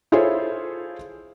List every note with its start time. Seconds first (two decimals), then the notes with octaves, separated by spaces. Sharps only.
0.12 E4 F4 G#4 A4 C5 C#5